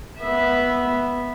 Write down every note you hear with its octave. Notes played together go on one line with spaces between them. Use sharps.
B3 E5